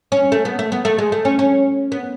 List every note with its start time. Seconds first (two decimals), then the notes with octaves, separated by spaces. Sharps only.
0.12 C#4
0.32 A3
0.45 B3
0.59 A3
0.72 B3
0.85 A3
0.98 G#3
1.12 A3
1.25 C#4
1.39 C#4
1.92 B3